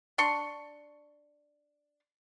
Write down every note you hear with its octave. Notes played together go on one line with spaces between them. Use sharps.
D4 C6 C#6